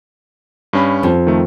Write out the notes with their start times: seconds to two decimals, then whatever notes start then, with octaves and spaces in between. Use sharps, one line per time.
0.73 G2 C#4 B5
1.03 F2
1.27 D#3 A3